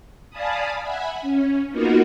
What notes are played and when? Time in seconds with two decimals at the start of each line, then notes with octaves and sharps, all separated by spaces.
0.30 D5 F5 G#5 A5 B5 D#6
0.83 E5 F#5 G#5 B5
1.22 C#4
1.69 A#3 B3 D#4 F4 F#4 A#4